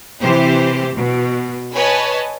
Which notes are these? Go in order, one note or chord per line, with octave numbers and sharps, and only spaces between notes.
C3 E3 G4 C5
B2
B4 C#5 D#5 G#5 A5